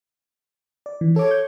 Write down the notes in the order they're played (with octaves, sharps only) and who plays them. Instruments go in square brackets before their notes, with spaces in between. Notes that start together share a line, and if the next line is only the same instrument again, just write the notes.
[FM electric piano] D5
E3
[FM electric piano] A4 D6 [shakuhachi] C#5
[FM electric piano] G6